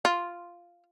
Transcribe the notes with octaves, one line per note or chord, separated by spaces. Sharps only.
F4